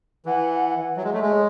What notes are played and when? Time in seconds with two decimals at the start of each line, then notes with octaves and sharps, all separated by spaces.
0.26 E3 F#5
0.96 F#3 E5
1.04 G#3
1.13 A3
1.22 G#3
1.31 C#5